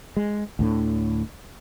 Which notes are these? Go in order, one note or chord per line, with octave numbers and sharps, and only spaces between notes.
G#3
D2 A2 D3